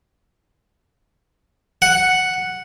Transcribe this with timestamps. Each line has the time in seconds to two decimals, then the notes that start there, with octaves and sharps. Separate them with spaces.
1.82 F#5